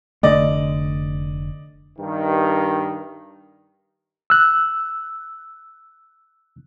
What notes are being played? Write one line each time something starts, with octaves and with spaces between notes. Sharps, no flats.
F1 D3 A3 D5 D#5
G2 D#3
E6 F#6